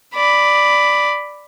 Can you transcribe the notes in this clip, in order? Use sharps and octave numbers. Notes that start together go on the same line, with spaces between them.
D5 B5